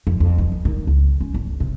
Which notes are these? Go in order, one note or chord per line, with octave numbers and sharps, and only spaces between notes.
F2
F2
E3
E2
D#3
C#2
C#4
G1
C3